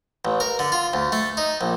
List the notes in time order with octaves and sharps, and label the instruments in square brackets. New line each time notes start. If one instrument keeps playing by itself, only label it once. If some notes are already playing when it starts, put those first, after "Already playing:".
[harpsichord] A1
A#4
D3
F4
D2
A3
D#4
A#1